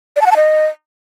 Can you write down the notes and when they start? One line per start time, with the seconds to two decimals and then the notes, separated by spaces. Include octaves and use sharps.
0.16 D5
0.21 A5
0.26 F#5
0.31 A5
0.36 D#5